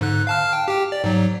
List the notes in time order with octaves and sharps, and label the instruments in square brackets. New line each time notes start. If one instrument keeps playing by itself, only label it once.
[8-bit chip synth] G#2 D3 F#6
F5 A5 F6
G5
G4 G5
D5
G#2 F#3